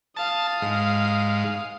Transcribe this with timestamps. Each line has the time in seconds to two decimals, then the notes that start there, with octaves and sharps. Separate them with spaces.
0.17 F5 A5 D#6
0.62 G#2